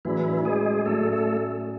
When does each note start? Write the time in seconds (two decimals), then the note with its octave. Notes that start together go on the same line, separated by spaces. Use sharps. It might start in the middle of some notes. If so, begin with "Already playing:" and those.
0.05 A2 E3 F#3 C#4 E4 G#4 D5
0.45 G#3 G#4
0.85 A2 F#3 A3 C#4 G#4 A4 D5
1.13 A3 A4